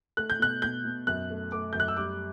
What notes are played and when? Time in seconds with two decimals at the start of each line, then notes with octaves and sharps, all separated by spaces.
0.17 A3 F#6
0.30 G6
0.40 B2 F#6
0.62 B2 G6
0.84 B2
1.07 F#2 F#6
1.30 A3
1.52 A3 D6
1.73 F#2 G6
1.80 F#6
1.88 E6
1.97 G3 D6